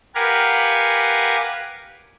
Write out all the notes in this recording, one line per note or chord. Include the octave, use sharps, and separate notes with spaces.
G4 A#4 B4 F5 F#5 G#5